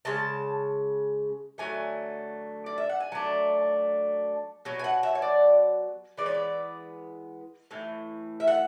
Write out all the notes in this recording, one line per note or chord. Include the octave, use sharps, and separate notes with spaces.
C#3 G#3 A5
D3 F#3 A3 G#5
D5
E5
F#5
G#5
F#3 A3 D4 A5
B2 F#3
G#5
F#5
E5
C#5
D5
E3 G#3 B3 D5
C#5
D5
A2 E3
E5
F#5